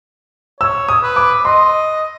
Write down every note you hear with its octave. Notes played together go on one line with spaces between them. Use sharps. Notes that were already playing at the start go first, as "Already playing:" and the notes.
C#5 E6
D#6
B4
D6
D#5 C6